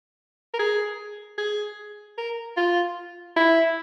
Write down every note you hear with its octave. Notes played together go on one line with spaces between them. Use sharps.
A#4
G#4
G#4
A#4
F4
E4